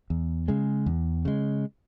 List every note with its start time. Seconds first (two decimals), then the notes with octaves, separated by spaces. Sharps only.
0.10 E2
0.48 C#3 G#3
0.86 E2
1.25 C#3 G#3